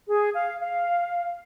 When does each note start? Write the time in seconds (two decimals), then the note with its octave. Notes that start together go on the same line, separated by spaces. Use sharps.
0.08 G#4
0.34 F5
0.60 F5